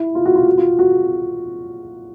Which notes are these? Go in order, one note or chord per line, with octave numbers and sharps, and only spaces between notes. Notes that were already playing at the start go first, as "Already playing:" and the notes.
Already playing: E4
F4
F#4
F4
F#4
F4
F#4